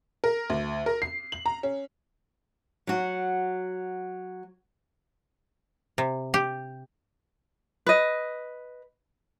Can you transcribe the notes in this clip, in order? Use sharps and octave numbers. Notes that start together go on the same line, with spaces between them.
A#4
D2
A#4
C7
F#7
A#5
C#4
F#3 F#4
C3
G4
B4 D#5